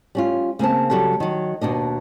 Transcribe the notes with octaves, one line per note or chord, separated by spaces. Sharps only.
G3 C#4 F4
C#3 A#3 C4 A5
C#3 F#3 G3 A4 A5
D#3 F#3
D#2 B2 D4 D#5